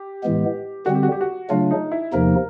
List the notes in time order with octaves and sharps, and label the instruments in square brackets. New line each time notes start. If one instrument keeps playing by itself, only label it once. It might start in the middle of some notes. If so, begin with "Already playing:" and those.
Already playing: [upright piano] G4
[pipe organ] A2 E3 G#3 B3
[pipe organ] D3 G3 C4 [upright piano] F#4
[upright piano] G4
F#4
G4
F#4
[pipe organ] C#3 F#3 A3 D4 [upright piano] F4
[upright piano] D#4
E4
[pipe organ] E2 C3 F3 A#3 D#4 [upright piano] A#4